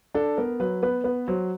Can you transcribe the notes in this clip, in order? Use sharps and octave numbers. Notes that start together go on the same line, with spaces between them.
D4 A4
B3 A#4
F#3 B4
B3 B4
B3 B4
F#3 C5